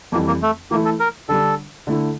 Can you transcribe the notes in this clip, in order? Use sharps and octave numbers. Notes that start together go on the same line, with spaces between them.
F2 E3 G3 A#3
A#3
A3
E3 A3 A#3 E4
A4
A#4
D3 G3 D4 A4
D3 A3 E4